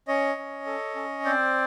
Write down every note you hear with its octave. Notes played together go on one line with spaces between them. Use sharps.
C#4 C#5 D#5
C#4
A4
C#4
C4 C5 D5